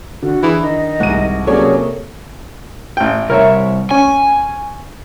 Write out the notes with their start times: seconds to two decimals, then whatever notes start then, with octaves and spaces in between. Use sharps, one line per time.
0.23 D3 F#4
0.43 E3 G#4
0.62 D#3 D#5
1.00 C2 G#2 F#5 D#7
1.47 C3 F#3 A#3 C#4 G#4 A4 C#5 D5
2.97 A1 G5
3.30 C2 A#4 C#5 E5
3.91 C#4 G#5